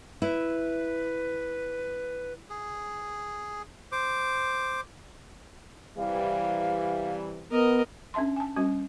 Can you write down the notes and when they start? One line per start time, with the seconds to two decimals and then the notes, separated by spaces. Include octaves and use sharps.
0.22 E4 B4
2.50 G#4
3.92 C5 D6
5.98 C3 E3 G3 F5
7.51 B3 A#4 D#5
8.14 C#4 D4 E5 A5 C6
8.36 G#5 A5
8.57 G3 C#4 F#4